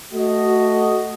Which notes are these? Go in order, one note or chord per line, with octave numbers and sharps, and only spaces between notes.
A3 F#4 D#5